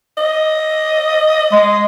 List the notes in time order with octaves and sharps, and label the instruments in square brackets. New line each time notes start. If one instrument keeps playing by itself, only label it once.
[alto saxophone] D#5
[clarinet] G#3